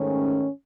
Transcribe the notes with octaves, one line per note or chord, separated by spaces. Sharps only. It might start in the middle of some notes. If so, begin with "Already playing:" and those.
Already playing: G#2 D#3 A3 C#4